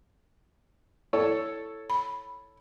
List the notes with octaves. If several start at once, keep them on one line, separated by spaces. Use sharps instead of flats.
E4 A4 C#5
B5